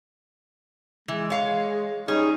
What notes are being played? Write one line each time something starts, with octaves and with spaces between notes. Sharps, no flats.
E3 G#3
C#5 F5
G3 C#4 D#4 G#4